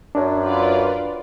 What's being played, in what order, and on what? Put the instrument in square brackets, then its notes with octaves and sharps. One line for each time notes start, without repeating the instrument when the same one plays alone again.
[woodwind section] F#2 [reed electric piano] D4
[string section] F4 B4 D5